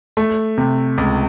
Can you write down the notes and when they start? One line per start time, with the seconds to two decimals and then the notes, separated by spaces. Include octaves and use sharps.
0.17 A3
0.58 C3
0.98 C#2